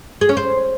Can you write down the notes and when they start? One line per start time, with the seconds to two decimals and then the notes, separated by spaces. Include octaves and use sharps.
0.21 G#4
0.29 C#4
0.37 C5